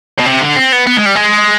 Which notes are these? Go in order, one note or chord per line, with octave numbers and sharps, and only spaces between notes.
B2
C3
D3
C4
B3
B3
G#3
G3
G#3